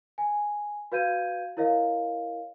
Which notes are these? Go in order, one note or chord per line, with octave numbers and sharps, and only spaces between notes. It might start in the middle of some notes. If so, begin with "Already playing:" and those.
G#5
F#4 B4 F5 G6 G#6 D#7
E4 A#4 C#5 D#5 F5